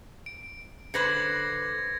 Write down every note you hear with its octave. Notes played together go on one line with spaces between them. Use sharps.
D7
D3 B4 C5 G#6 A#6 C#7